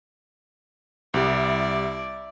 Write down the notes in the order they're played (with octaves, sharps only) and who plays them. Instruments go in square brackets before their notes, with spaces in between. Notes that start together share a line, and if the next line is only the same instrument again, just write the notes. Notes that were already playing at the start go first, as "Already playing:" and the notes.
[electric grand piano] C2 G3 [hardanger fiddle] E4 D5